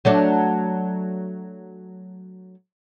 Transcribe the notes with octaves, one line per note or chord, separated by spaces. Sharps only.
F#3 A3 D4